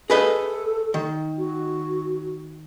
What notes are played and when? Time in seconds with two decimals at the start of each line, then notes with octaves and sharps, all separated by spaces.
0.10 G#4 A4 B4 D#5
0.94 D#3
1.38 F#4